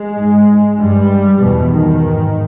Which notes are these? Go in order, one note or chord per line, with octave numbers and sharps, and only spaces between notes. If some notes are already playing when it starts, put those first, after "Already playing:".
Already playing: G#3
G#2
G2 G3
E2 B2 E3
D#3
G#2